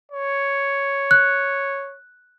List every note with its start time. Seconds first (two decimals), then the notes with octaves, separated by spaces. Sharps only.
0.12 C#5
1.11 F#6